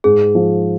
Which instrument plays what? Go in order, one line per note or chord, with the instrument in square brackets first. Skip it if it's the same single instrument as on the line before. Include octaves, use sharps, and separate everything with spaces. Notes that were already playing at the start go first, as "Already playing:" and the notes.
[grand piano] G#2 [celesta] G#4
[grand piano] F3